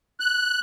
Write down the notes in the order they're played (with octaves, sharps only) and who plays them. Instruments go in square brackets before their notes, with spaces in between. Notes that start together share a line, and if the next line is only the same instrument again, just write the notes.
[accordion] F#6